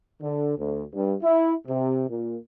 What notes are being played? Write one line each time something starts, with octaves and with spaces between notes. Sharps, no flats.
D3
D2
G2
E4
C3
A#2